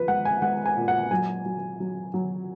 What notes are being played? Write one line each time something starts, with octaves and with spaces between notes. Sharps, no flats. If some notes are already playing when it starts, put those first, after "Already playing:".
Already playing: F3 B4
G#3 F#5
G#5
G#3 F#5
G#5
A#2
F#5
F#3 G#5
F#3
F#3
F#3